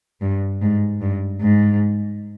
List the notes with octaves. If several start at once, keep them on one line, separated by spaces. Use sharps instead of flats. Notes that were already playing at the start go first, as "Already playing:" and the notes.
G2
G#2
G2
G#2